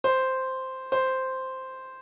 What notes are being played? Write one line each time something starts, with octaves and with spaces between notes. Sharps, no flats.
C5
C5